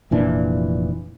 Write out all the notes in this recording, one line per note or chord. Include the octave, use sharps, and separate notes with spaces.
F1 A#2 E3 D4